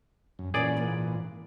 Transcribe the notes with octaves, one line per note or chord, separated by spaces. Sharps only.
F#2
A#2 E3 A#3 C#4 G#4 D5
G#2 A#3